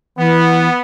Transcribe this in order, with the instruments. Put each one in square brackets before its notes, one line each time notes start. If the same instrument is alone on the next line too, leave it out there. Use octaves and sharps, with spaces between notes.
[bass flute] E3 [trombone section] B3